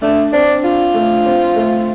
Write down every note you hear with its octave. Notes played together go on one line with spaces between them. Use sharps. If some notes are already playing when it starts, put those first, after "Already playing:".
A3 D4
C4 D4
F4
A3
C4
A3